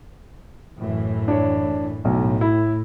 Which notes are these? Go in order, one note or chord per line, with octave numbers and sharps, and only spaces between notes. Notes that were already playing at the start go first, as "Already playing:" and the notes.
F#2 A2 E3
D4 C#5
B1 A2
E4